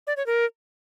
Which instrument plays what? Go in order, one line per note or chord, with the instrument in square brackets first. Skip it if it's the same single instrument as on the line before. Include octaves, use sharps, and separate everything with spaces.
[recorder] D5
C#5
A#4